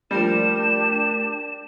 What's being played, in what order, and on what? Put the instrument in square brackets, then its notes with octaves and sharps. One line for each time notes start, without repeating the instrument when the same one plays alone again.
[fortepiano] F3 G3 [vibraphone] A3 A#4 D5 [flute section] D4 G4 [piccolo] E7